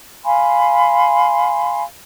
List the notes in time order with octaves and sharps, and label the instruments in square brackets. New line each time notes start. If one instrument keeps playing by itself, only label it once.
[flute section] F5 G#5 B5 C6